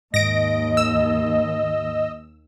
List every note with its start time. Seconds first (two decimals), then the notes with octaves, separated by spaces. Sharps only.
0.14 D#2 G#2 D#5 A#6 D7
0.77 E6